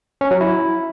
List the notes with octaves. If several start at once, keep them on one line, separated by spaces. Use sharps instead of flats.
C#4
F#3
E4